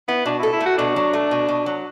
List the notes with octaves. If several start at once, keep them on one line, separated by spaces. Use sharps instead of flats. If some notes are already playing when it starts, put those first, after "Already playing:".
B3 E4
B2 D4
E4 A4
E4
A3
F#4
B2 D4
F#3
A3
B2
B2
F#3